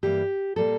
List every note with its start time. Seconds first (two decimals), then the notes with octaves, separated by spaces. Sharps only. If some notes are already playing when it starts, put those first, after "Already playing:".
0.03 G2 E3 G3 A#3 G4
0.56 A#2 G3 A#3 A4